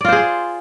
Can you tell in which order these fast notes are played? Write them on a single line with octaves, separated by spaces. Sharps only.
D5 F4 C5 G#4